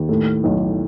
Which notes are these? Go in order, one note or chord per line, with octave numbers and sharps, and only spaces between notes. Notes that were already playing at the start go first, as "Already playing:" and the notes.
Already playing: D#2
A2
B1